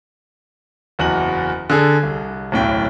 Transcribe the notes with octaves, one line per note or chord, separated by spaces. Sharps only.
F#1 E2 F#4 D#5 F#7
D3 G#4 A4
C2
D1 B1 A2 G5